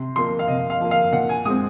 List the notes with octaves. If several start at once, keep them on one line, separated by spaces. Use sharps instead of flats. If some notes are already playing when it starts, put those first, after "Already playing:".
Already playing: C3 C6
F3 A#3 C6
F5
C3 D#5
F5
F3 A#3
F5
A#2 F#5
G#5
G#3 C4 D#6